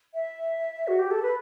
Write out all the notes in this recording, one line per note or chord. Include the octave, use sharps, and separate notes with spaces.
E5
F#4
G4
A4
B4